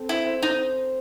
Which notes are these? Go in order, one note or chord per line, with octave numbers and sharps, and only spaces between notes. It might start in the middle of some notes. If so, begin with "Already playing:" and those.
Already playing: C4 A4
E4 C5
C5
D#4 C5